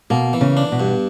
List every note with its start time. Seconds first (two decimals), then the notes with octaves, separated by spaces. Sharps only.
0.10 B2 A#3
0.33 E3
0.41 C#3
0.57 D4
0.72 B2
0.80 G2